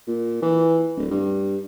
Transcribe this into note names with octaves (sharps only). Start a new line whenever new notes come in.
A#2
E3
D1
G2